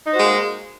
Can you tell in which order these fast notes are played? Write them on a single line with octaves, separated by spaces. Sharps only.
D#4 C5 F#4 G#3 A#3